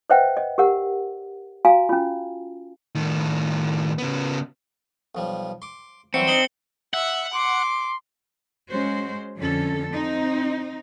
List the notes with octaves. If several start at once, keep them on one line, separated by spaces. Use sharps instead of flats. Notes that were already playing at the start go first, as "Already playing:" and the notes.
B4 C5 D#5 E5 F#5 G5
D#5
G4 A#4 F#5
F#4 F5 G#5 A#5
C#4 F4
A2 D#3
C#3 B3
B1 F3 G3
C6 D6
E3 F#3 G3 C4 C#7
D4 D#4 C5 C#7 F#7 G7
E5 F#5
C6 D6
G#3 C#4 F#4 C5
F2 D3 C#4 A4
C4 D#4